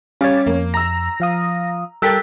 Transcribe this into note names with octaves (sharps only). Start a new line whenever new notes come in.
G3 C#4 C#5 F5 D6 A6
F2 A#3
A#5 E6 A#6
F3 F5 D#6
G3 A4 A#4 G5 E6 F#6 A6 B6